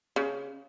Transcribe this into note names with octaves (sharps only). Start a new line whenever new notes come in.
C#3